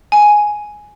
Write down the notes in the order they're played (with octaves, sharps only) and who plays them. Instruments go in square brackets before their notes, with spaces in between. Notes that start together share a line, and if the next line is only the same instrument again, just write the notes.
[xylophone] G#5